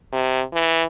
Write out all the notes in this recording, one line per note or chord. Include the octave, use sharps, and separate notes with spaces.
C3
E3